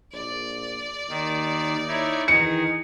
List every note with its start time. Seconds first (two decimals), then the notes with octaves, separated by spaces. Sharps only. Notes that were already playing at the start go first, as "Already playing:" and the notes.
0.13 A#1 D5
1.09 D#2 D#3
1.87 D#4 E4 C#5
2.28 D#3 E3 D#4 G#4 C#7